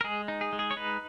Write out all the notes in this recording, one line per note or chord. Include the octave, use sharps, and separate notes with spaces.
A#4
G#3 G#4
D#4
G#4
G#3
G#4
C#5
D#4 B4